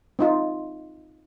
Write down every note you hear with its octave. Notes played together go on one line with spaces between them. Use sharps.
C4 D#4 F4